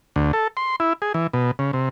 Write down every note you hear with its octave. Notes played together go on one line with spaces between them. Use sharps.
D2
A4
C6
E4
G#4
E3
B2
C#3
C3